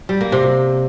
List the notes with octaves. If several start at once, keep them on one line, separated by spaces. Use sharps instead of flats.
G3
A#3
C3